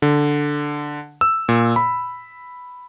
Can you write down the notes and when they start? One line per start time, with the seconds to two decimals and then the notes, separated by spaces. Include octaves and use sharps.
0.02 D3
1.21 E6
1.49 A#2
1.76 B5